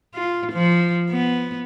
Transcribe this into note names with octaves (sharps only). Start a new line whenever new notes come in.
F4
F3
B3